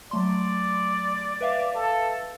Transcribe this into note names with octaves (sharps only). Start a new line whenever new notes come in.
F#3 A3 D5 C6
B4 E5 F5
A4